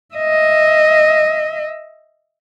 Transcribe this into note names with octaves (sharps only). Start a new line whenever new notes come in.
D#5 E5